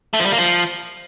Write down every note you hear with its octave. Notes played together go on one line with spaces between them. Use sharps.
A3
F3
G3
A#3
F3